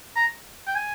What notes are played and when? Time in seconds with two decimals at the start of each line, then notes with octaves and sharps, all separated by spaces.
0.16 A#5
0.68 G5
0.76 G#5